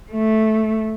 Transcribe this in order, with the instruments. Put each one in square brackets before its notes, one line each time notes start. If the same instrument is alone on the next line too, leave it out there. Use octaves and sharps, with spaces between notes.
[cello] A3